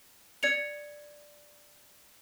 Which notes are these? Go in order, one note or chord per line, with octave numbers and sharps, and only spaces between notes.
D5 G#6 C#7 F7